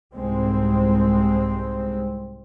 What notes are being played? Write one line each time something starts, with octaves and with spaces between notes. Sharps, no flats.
C2 G#2 G#3 C4